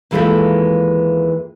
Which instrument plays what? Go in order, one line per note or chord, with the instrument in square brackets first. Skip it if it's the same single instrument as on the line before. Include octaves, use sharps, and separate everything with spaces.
[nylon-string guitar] D#2 E3 G#3 F4 A4 E5